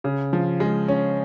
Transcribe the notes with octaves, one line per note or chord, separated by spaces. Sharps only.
C#3
F3
G#3
C#4